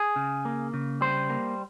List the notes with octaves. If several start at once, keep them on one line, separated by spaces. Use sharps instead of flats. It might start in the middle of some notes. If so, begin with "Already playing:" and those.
Already playing: G#4
C#3
A#3
C#3
G3 C5
A#3